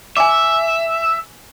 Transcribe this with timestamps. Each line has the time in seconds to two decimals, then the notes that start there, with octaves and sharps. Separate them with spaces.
0.17 E5 G#5 A5 D6